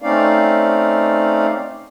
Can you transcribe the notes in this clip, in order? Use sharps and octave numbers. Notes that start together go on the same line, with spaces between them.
A3 C4 C#4 D#4 D5 F5